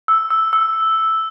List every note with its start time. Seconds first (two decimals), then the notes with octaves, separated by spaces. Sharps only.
0.08 E6
0.30 E6
0.53 E6